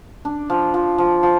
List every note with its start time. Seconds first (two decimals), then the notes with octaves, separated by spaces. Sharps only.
0.25 D4
0.50 F3
0.74 F3
0.98 F3
1.23 F3